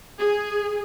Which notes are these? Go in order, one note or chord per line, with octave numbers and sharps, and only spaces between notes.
G#4